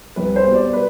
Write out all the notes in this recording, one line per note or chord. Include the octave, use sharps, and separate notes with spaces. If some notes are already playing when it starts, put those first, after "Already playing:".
C2 B4
C5
B2 G3
D5
B4